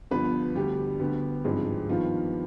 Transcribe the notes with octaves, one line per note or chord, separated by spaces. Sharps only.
G1 G2 F3 B3 B4
D2 D3 G3 B3 G4
D2 D3 G3 B3
G#1 G2 F3 G#3 C4
G2 D#3 F3 B3 F4